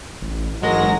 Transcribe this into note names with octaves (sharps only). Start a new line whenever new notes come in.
A1
A1 G#2 F#3 G#3 A#4 A#6